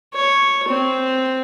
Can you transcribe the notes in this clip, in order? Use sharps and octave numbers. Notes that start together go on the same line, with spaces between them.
C#5
C4